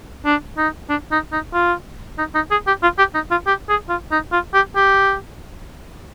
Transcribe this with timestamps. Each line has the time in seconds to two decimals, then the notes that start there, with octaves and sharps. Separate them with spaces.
0.25 D4
0.58 D#4
0.89 D4
1.11 D#4
1.32 D#4
1.53 F4
2.18 D#4
2.35 D#4
2.51 G#4
2.67 G4
2.83 F4
2.98 G4
3.14 D#4
3.31 F4
3.47 G4
3.69 G#4
3.89 F4
4.11 D#4
4.32 F4
4.54 G4
4.76 G4